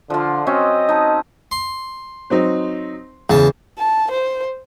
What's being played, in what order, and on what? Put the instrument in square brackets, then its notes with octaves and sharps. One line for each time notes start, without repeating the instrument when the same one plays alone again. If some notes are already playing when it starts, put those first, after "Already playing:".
[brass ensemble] D3 [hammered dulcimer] F3 F4
[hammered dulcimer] F#3 C4 C#4 [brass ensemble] D#5
[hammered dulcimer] D#4 A5
[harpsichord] C6
[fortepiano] F#3 C4 D#4
[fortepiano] E2 [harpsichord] C#3 A5
[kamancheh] A5
C5